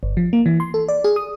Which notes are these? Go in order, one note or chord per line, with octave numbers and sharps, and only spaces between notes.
G1
F3
A#3
E3
C6
A4
D5
G#4
D#6